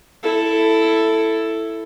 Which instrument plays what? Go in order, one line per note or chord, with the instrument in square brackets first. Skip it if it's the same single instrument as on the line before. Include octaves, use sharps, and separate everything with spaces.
[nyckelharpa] E4 A4